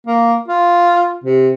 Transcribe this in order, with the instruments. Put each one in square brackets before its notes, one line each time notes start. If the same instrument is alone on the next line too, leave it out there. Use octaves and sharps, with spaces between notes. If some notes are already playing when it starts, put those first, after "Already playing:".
[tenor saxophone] A#3
F4
C3